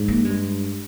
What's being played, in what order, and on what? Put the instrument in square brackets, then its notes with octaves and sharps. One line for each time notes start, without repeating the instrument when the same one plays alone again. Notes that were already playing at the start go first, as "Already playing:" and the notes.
Already playing: [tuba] G#2
[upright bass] A#3
[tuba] G2 [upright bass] G#3